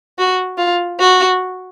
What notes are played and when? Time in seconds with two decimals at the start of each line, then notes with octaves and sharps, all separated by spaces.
0.18 F#4
0.58 F4
1.00 F#4